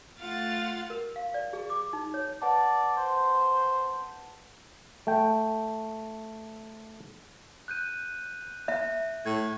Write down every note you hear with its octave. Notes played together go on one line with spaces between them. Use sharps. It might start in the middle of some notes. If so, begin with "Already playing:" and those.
A3 F4 F5 F#5 A6
A#4
F5
D5
G#4
D6
D#4
C#5
B4 D5 F#5 A5
C5
A3 G5
F#6 G6 D#7
E5
A2 G#6